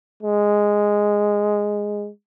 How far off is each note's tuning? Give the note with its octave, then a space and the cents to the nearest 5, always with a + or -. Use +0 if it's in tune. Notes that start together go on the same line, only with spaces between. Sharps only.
G#3 -5